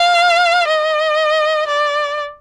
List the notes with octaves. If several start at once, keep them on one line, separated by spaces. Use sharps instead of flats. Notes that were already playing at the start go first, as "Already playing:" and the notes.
Already playing: F5
D#5
D5